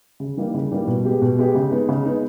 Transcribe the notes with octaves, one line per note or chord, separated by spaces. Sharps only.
C#3
E3 G3 A#3 D#4
C#3
E3 G3 A#3 D#4
B2
G#3 B3 G4
B2
G#3 B3 G4
C#3
G#3 B3 D#4
C#3
G#3 B3 D#4